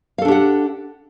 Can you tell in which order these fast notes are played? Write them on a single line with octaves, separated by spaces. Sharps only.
F5 A4 D4 G4 F#5